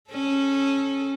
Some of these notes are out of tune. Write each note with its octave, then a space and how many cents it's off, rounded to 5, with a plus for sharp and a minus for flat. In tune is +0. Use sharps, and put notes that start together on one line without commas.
C#4 -15 A4 -25